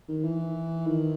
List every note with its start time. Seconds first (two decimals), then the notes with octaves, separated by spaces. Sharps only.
0.09 D#3
0.24 E3
0.87 D#3